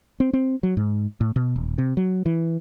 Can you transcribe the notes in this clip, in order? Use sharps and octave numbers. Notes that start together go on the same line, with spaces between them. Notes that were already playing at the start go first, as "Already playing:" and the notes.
C4
C4
F#3
G#2
A2
B2
D#1
C3
F#3
E3